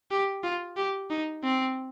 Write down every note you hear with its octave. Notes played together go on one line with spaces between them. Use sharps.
G4
F4
G4
D#4
C4